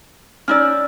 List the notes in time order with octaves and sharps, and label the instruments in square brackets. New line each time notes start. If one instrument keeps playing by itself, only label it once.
[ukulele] C#4 D#4 D5 [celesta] E6 F6